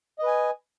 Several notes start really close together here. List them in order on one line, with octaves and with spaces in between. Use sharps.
D#5 B4 G#5